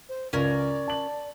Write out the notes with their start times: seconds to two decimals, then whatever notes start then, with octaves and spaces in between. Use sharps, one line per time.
0.09 C5
0.33 C#2 C#4 A#4 D5
0.88 A5 F#7